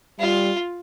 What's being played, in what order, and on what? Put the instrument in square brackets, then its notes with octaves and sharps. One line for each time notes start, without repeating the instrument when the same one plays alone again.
[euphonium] G3 [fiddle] F4